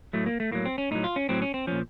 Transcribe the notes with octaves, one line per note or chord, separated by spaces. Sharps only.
A2 F#3 A3
A#3
A3
A2 F#3 A#3
C4
C#4
A2 F#3 D#4
F4
C#4
A2 F#3 C4
C#4
C4
A#2 F3 C#4